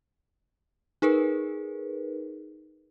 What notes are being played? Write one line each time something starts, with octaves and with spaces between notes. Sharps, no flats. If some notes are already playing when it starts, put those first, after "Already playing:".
D#4 G#4 A#4 B4